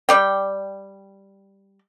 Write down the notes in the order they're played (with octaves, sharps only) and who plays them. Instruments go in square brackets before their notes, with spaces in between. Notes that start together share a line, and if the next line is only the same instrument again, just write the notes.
[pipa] G3 D5 G5